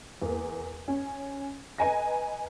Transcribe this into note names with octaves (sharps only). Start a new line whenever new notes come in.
E2 A#3
C#4
B4 D#5 G#5 A#5 A#6